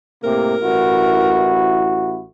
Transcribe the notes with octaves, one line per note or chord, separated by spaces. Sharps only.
A2 C3 A#3 A#4
A1 E4 F#4